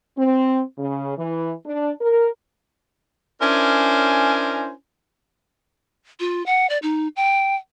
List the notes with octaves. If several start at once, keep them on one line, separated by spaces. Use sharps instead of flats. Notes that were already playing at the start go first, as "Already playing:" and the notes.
C4
C#3
E3
D4
A#4
C#4 D4 E4 A#4 C5 G#5
F4
F#5
D5
D#4
G5